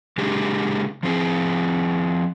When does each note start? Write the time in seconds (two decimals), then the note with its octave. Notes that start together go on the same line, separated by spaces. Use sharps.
0.18 C#3 G#3 D4 G4 G#4
1.03 F3 C4 G#4